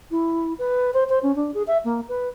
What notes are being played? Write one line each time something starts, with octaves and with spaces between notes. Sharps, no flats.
E4
B4
C5
C5
C#4
D4
G#4
E5
A#3
B4